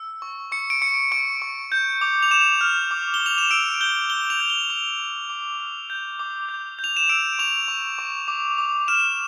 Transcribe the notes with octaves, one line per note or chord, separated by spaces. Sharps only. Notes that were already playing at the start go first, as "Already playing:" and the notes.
Already playing: E6
C#6
C#6 C#7
D7
C#6 C#7
C#6 D7
C#6
G6
D6
F7
D6 E7
F6
D6
G7
D6
F7
E7
E6 D7
G6 G7
C#6 G7
F7
G6
G7
C#6 F7
C#6
D6
F6
G6
D6
G6
G6
F7
E7
E6 D7
C#6 F7
C#6
C#6
D6
D6
F6 E7